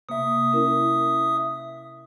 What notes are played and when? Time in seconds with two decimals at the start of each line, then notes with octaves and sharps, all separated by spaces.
0.09 C3 A#3 E5 D#6
0.53 C#4 E4 A#4